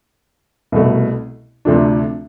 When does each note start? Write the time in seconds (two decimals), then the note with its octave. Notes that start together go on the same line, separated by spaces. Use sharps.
0.72 C2 B2 A3
1.65 D2 C3 F3 A3 D4